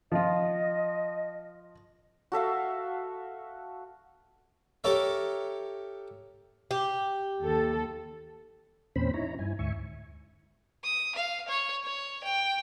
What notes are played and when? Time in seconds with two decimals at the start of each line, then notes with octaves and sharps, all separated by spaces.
0.12 F3 F4 D#5
2.32 F#4 A4 E5 F5
4.84 G4 A4 A#4 C#5 E5
6.71 G4
7.42 D#2 A4
8.96 E2 A#2 C4 C#4 C5 B5
9.14 D#4 E4 C#5 A#5
9.39 G2 E4 G#5
9.59 D2 G#2 E5 G#5 C#6
10.84 D#6
11.16 F5
11.48 C#5
11.84 C#5
12.24 G5